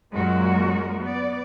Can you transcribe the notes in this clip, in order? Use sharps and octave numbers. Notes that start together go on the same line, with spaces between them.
F#2 A#2 F#3 G#3 F#4 A#4
B3 D5